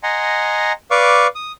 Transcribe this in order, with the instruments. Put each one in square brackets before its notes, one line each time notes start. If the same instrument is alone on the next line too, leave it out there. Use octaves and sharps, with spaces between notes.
[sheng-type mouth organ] D#5 F#5 G#5 A#5 C6
B4 D5 F5 C#6 D6
D#6